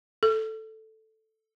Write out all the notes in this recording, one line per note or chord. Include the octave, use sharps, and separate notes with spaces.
A4